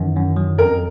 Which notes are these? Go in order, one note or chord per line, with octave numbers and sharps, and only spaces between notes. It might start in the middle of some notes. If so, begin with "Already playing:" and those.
Already playing: F#2 D#3 E3
F#2
F#3
F2 A#4